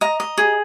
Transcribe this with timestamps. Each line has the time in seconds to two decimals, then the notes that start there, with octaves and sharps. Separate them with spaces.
0.01 D#5 A#5
0.20 D#5
0.38 G#4